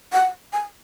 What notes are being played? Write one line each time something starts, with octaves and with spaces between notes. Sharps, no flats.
F#5
G#5